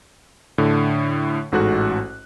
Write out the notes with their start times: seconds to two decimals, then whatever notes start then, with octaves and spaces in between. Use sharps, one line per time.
0.58 A2 D3
1.52 A1 G#2 F#4 A4 F#6